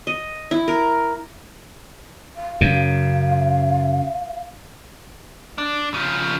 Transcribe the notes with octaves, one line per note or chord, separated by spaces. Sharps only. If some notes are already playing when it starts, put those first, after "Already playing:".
D#5
E4
A#4
F5
F#2 C#3
D4
C#3 F3